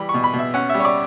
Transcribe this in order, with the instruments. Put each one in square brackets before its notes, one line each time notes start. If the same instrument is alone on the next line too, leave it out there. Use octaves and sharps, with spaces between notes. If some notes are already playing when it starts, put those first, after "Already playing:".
Already playing: [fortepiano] E3 G3 B5
C#6
B2
B5
B2
E5
C#4 F#5
G3 E5
C#5
D5